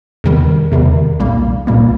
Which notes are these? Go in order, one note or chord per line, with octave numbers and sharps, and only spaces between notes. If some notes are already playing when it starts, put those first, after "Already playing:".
E2 C3 D#3 G3
E2 C3 D#3 G3
B1 A#2 G3 A#3
B1 A#2 G3 A#3